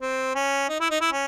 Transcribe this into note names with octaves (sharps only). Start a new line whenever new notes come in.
C4
C#4
D#4
E4
D#4
E4
C#4